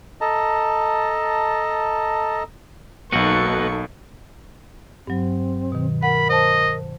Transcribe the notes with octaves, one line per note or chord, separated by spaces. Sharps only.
A4 D#5 A5 A#5
B1 A#3 B3 D#4 F#4 A4 C#6 C#7
G2 F#3 C4
B2 D#3
A#4 F#5 B5
C5 D#5 A5